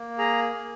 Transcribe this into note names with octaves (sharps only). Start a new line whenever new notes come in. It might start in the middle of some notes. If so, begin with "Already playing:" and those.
Already playing: A#3
G#4 A#5
A#3